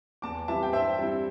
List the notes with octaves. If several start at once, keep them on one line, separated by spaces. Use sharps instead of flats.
E2 A5 D6
E3 G3 C4 E4 E5 A5
G5
G2 C5 E5
G3 C4 E4